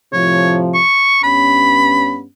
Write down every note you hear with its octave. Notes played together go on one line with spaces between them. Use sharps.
A2 C3 F3 C#5
C#6
G2 B3 C#4 B5